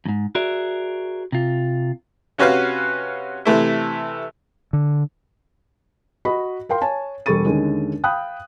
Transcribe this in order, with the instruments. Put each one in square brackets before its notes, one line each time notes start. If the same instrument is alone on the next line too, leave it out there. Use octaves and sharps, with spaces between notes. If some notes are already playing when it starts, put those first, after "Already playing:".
[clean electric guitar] F2 G#2
F#4 G#4 A#4 D5 E5
C3 F4
[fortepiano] C3 C#4 F#4 B4 F5 F#6
C3 E3 A3 E4
[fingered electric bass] D3
[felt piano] F#4 D#5 B5
A#4 F5 G5 C6
C#5 G#5 A5
E1 G3 A4 C#6 A6 D#7
D#2 D3 G#3 C#4
F5 G5 B5 D#6 F#6